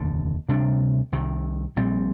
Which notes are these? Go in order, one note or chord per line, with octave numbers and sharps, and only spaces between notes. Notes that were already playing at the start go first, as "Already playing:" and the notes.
Already playing: F1 D#2 D3
D2 C3 G3 D4
C2 C3 D#3
A#1 A#2 G3 C4